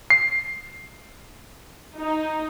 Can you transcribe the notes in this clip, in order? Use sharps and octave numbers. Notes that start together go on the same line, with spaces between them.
C7
D#4